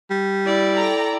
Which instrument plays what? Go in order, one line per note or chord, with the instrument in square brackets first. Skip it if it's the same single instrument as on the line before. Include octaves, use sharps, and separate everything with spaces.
[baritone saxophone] G3
[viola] E4 D5
[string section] A4 G5 A#5